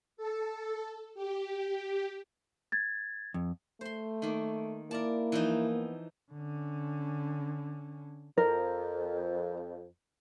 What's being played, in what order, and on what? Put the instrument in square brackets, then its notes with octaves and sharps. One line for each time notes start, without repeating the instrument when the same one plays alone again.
[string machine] A4
G4
[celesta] G#6 A6
[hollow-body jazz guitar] F2
[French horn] A3 [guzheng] C5 C6
[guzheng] D#3 A#3
[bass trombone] A#3 [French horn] E4 [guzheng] A#4 D5 A5
[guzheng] E3 F3 D#4
[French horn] B3
[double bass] D3 C#4
[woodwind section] F2 [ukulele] A#4